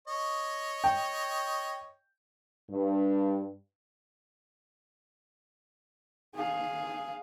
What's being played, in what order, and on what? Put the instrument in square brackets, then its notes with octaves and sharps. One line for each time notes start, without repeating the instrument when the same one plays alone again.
[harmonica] C#5 D#5
[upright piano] G5
[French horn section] G2
[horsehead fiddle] G#4 F5